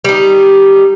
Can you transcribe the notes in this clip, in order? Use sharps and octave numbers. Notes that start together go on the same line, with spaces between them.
G3 D#4